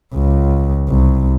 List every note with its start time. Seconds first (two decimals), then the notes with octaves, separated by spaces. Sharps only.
0.15 C#2
0.89 C2